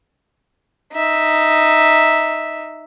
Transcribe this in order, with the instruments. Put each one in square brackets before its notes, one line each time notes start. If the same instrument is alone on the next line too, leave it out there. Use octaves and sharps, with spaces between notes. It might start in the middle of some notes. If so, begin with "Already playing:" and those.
[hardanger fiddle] D#4 E5